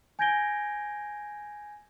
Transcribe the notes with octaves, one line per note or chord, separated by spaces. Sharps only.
G#5 G6 G#6 A#6 D7 G7